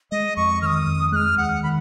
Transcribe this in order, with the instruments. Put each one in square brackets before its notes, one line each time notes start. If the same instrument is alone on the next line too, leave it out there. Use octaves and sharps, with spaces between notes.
[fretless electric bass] G#3 [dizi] D#5
[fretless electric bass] F2 [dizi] C#6
[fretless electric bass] D#3 [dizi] D#6 F6
[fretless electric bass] F2
[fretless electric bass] G#3 [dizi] F#6
[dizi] F6
[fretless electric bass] D#2 [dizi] F#5
[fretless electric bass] D#3 [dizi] B5